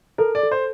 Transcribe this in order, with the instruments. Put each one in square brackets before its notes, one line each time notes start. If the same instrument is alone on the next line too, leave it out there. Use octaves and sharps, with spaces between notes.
[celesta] A4 [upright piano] A#4
[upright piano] D5
[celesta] A4
[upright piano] C5